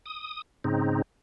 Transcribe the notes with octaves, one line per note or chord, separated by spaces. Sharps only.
D#6
G#2 C#3 C4 D#4